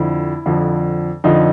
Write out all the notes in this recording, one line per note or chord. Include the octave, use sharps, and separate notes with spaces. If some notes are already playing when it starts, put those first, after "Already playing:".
Already playing: F2 D3 F3 E4
F2 D3 F3
F2 D3 F3 D#4